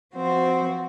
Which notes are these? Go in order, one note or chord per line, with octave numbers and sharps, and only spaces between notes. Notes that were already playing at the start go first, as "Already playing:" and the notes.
F3 C4 F#4 C5